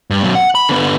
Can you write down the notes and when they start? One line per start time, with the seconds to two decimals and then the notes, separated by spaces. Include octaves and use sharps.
0.10 G2
0.23 F#2 B2
0.35 F#5
0.55 B5
0.69 D3 B3